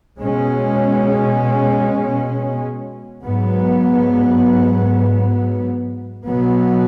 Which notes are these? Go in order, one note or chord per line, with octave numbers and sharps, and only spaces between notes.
B2 G#3 C#4
G#2 F#3 B3
B2 F#3 B3